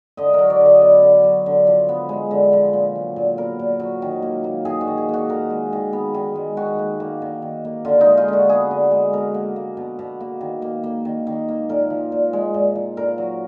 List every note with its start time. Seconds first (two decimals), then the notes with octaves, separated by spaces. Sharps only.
0.17 D3 D#5
0.34 F#3 A#4
0.50 D5
0.61 D3
0.66 D#5
0.81 B3 D5
1.03 D3
1.24 F#3
1.46 D3
1.67 F3
1.89 B3
2.09 G#3
2.31 D3
2.53 F3
2.73 A#2
2.95 F#3
3.16 A#2
3.37 B3 A#4
3.59 A#2
3.80 F#3
4.02 D#3
4.22 A#3
4.44 A#3
4.65 D#3 G#4
4.81 F#4
4.87 D#3
4.98 G#4
5.09 A#3 F#4
5.29 D#3 A#4
5.50 G#3
5.73 D#3
5.93 B3
6.14 D#3
6.35 G#3
6.57 D#3 F#4
6.79 A#3
7.00 A#3
7.22 D#3
7.42 D#3
7.65 A#3
7.85 D3 F4
8.01 D#4
8.06 G#3
8.17 F4
8.28 D3 F#4
8.49 B3 G#4
8.71 D3
8.91 G#3
9.13 B2 A#4
9.34 A#3
9.56 A#3
9.77 B2
9.99 B2
10.20 A#3
10.41 D#3
10.62 A#3
10.83 A#3
11.05 D#3
11.27 D#3
11.48 A#3
11.69 A#2 A#4
11.90 F3
12.12 A#2
12.33 G#3
12.54 A#2
12.75 F3
12.97 A#2 A#4
13.18 F#3